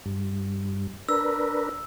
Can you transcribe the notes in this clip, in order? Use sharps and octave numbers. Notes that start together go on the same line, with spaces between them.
G2
D4 A#4 B4 E6